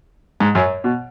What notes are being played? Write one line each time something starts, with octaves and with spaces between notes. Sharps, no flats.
G#2
F#2
B2